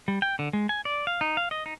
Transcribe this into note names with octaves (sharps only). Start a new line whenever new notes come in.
G3
G5
D3
G#3
G#5
D5
F5
D#4
F5
D#5
D#4